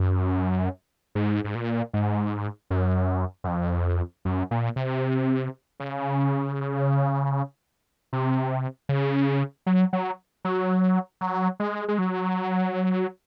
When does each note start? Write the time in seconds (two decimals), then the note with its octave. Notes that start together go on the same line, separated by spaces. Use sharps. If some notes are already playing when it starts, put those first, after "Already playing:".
Already playing: F#2
1.15 G#2
1.44 G#2
1.55 A#2
1.94 G#2
2.70 F#2
3.44 F#2
3.48 F2
4.25 F#2
4.51 A#2
4.76 C3
5.80 C#3
8.13 C3
8.89 C#3
9.66 F#3
9.93 F#3
10.45 F#3
11.21 F#3
11.60 G#3
11.88 G#3
11.99 F#3